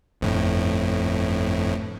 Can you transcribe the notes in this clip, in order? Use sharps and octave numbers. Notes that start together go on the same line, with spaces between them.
G1 F2 A2